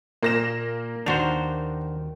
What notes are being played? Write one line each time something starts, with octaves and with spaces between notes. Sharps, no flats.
A#2 A#3 A#6 E7
D#2 D#3 D4 F#4 C5 F7